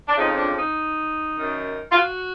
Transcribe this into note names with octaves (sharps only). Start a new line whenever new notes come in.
D4
F2 C#3 F3 D#4
D4
D#4
F#2 D#3
F4
F#4